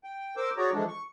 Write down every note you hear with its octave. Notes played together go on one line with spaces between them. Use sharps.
G5
A#4 C5 D6 E6
F#4 G#4 C#5 D5 A#5
E3 F3 G#3 A3 D4
C#6